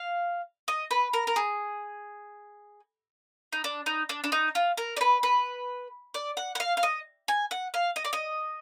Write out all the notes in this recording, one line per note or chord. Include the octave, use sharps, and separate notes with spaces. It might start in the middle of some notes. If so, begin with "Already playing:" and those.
Already playing: F5
D#5
B4
A#4
A#4
G#4
D#4
D4
D#4
D4
D4
D#4
F4
A#4
D5
B4
B4
D5
F#5
F#5
F5
F5
D#5
G#5
F#5
F5
D#5
D5
D#5